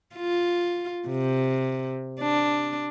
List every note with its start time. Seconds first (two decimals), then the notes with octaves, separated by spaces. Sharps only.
0.15 F4
1.08 C3
2.21 D4